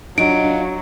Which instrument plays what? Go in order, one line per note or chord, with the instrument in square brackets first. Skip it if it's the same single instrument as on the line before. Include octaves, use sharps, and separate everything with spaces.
[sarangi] F#3 [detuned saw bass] D4 [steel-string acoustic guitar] D#4 F4 [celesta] D7